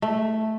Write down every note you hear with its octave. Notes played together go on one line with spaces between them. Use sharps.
A3